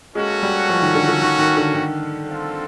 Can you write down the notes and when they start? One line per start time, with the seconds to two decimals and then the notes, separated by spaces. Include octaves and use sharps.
0.15 G#3 A#3 C#4 F#4 A4
0.43 G3
0.69 F3
0.82 D#3
0.95 D3
1.08 D3
1.21 D#3
1.39 D#3
1.57 D3
1.74 D#3
2.28 C4 F4 A4